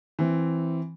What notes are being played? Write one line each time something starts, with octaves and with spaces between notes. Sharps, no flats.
E3 C4